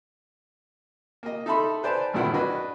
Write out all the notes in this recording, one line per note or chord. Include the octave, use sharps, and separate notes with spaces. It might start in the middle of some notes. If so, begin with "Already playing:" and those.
A#3 D#5
D#4 A4 E5 A5 B5 C6
B4 C5 D5 G#5 A5
G#1 G2 A#2 D#3 E4 F#5
D4 F#4 B4 D#5